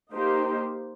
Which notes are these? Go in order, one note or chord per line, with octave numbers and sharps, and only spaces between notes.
A#3 D#4 G4 C5